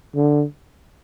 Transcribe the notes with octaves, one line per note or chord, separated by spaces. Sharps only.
D3